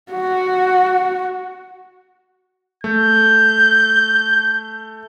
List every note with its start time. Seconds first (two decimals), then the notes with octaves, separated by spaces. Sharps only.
0.12 F#4
2.84 A3 G6